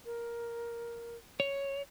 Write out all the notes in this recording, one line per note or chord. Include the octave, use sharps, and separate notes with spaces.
A#4
C#5